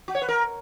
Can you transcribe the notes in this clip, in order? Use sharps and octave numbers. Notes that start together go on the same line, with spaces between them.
F#4
C#5
B4
A#4